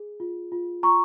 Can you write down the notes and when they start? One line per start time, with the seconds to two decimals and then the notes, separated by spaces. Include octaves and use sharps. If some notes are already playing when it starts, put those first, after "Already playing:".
Already playing: G#4
0.20 F4
0.52 F4
0.83 F4 A#5 C#6